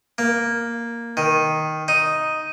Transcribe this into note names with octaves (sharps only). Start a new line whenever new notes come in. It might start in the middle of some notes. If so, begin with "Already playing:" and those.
A#3
D#3
D#4